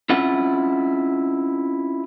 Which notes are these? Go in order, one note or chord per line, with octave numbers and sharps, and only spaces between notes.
C4 C#4 E4 F4 F#5